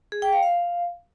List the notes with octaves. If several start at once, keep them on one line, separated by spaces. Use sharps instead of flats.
G#4
G5
F5
F5